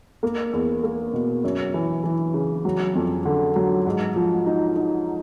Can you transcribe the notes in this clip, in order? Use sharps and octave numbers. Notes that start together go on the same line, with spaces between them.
A#3
E2
A#3
B2
F#2
E3
E3
C#3
F#3
F2
D3
F#3
G#2
F3
D#4
D#4